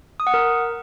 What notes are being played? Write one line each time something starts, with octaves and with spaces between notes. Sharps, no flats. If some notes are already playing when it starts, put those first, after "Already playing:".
D#6
F#5
A#4